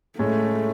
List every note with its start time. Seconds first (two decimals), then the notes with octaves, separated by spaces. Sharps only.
0.19 A2 G#3 A3 C#4